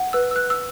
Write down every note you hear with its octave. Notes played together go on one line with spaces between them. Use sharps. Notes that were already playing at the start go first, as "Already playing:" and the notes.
Already playing: F#5
B4 E6
E6
B4 F#6
E6